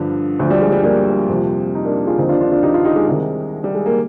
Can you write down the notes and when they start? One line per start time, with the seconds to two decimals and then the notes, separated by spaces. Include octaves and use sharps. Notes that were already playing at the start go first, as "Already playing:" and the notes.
Already playing: G2 D3 F3
0.39 D2 D3 F3
0.51 G3
0.62 G#3
0.72 G3
0.84 G3 A#3
1.29 F2 C3 F3
1.75 D#4
1.84 A#3 D4
2.07 F4 G#4
2.18 D#2 D3 F3 C4 D#4
2.29 D4 F4
2.40 D4 F4
2.51 D4 F4
2.63 D#4 G4
2.74 D4 F4
2.85 D#4 G4
2.96 G#3
3.07 C2 C3 D#3 G#3
3.64 G3
3.75 G#3
3.86 A#3